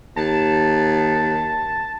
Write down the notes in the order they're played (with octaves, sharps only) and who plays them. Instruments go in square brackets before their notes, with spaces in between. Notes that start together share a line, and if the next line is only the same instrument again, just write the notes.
[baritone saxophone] D#2 [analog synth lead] A5